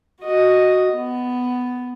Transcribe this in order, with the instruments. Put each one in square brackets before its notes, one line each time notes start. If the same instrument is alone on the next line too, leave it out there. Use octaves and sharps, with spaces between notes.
[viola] F#4 D#5
B3